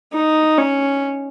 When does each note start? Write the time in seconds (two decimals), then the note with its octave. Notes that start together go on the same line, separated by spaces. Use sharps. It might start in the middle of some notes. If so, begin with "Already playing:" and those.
0.13 D#4
0.58 C#4